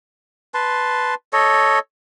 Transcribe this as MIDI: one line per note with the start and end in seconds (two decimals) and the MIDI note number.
0.54 1.14 71
0.54 1.14 81
0.54 1.14 84
1.33 1.79 69
1.33 1.79 73
1.33 1.79 75